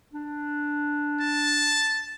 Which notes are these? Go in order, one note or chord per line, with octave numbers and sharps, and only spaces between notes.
D4
A5